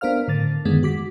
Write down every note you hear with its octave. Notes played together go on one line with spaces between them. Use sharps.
B3 D4 A#4 C5 F5 F6
A2 D3 A6
F#2 D3 D#3 G#3 B3
F#4 D6 B6